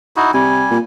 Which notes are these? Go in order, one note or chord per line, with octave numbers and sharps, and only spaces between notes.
D#4 E4 F#4
C3 G3 G#5
A#2